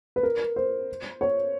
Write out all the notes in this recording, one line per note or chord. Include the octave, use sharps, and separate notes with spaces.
B4
A#4
C5
C#5